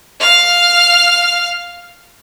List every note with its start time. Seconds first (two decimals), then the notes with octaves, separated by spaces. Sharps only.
0.20 F5 F6